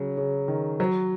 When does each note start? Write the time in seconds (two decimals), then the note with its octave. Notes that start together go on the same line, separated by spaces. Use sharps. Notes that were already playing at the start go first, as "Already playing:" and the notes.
Already playing: C#3 F#3
0.18 C#3
0.48 D#3
0.80 F#3